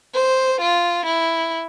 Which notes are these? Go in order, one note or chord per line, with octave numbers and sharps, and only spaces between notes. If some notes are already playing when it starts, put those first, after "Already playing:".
C5
F4
E4